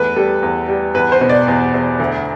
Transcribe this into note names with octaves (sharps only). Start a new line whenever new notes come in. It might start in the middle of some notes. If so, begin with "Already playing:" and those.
Already playing: E2 A3 B4
G3 A4
E2
G3
E2 B4
C5
B2
D5
E2
E2
D2